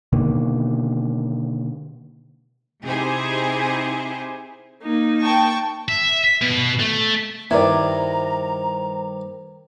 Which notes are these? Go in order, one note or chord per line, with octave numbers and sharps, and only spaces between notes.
B2 D3 D#3 A#3
C3 D#4 E4 G4 G#4 C5
A#3 D#4
G5 A5 C#6
E5
B2
A3
G2 D#3 E4 C5 D5 A#5